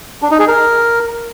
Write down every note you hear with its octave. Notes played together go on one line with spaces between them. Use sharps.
D4
D#4
G#4
A#4